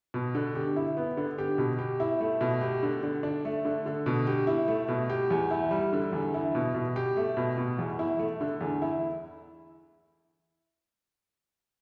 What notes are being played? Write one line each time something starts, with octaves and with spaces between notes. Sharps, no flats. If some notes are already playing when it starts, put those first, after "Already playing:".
B2
D3
G4
E4
B3
D3
G4
B2
G4
E4
A3
B2
G4
D3
D3
D4
A3
D3
D3
B2
G4
E4
A3
B2
G4
E2
E4
G3
D3
E2
E4
B2
B2
G4
A3
B2
B2
E2
E4
A3
D3
E2
E4